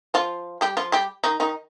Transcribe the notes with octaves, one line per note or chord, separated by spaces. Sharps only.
F3 F4
G3 G4
F3 F4
G3 G4
D#3 D#4
D#3 D#4